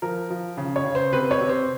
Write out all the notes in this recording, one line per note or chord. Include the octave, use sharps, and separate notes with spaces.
F3 A#4
F3
C#3
C#5
C#3
C5
C3 B4
C#5
C3
C5